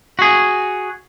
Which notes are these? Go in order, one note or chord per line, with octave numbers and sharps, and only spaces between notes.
F#4 G#4